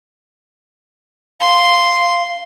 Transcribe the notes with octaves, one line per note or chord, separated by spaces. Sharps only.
F5 C6